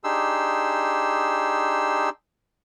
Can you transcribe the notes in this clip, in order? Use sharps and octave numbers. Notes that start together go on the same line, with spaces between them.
D4 D#4 G4 G#4 C6 E6